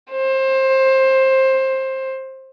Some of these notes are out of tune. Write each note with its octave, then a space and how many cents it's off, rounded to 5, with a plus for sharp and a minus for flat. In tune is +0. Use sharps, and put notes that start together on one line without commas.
C5 +20